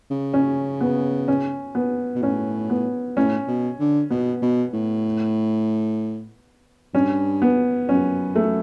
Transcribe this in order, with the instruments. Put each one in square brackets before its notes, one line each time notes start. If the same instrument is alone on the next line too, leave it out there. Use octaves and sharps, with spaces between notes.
[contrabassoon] C#3
[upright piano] C#4
B3
C#4
B3
[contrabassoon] B2
[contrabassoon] A2 [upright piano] C#4
[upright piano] B3
[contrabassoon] A2 [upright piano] C#4
[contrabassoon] B2
D3
[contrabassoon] B2 [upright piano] B3
[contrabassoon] B2
A2
[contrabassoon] G2 [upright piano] C#4
[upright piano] B3
[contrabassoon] F#2 [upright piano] C#4
[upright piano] A3